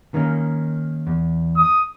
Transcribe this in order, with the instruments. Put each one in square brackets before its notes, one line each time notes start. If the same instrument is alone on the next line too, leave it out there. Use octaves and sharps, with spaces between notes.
[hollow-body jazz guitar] D#3 A#3 C#4
E2
[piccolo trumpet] D#6